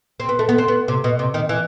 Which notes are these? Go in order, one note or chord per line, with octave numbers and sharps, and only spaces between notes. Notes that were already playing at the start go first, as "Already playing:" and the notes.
C4
B3
A3
B3
C4
B3
C3
B2
C3
D#3
E3